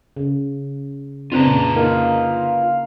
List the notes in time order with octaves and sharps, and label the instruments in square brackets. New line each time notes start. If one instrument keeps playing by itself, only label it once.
[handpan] C#3
[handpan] C#3 D4 [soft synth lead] C4 [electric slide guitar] F4 B4 A#5
[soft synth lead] A#2
[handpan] A#3 D#4 A#4 [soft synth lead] F5